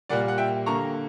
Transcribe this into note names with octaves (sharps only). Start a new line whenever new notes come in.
A#2 G3 A#3 D5 F#5
F#5
E5 G5
D3 A#3 A#5 C#6